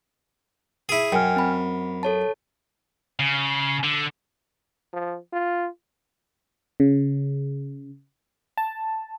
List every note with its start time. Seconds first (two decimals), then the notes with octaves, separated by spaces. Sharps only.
0.89 E4 G#4
1.12 F#2 G5 G#5 F6
1.36 C4 B5
2.03 A4 C#5 A5
3.19 C#3
3.83 D3
4.93 F3
5.33 F4
6.80 C#3
8.57 A5